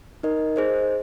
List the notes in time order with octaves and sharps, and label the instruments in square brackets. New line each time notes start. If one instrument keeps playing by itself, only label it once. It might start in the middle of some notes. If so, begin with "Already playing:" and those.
[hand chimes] D#4 A#4 D#5
G#4 C5 D#5